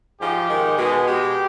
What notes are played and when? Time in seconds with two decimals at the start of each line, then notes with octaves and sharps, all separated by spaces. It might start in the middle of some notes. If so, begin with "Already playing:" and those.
0.19 G#2 F3 G#3 G4
0.48 G#2 D#3 G#3
0.77 B2 G#3
1.05 B2 G#3 G4